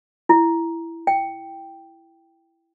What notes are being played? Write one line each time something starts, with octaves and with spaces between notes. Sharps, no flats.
E4
G5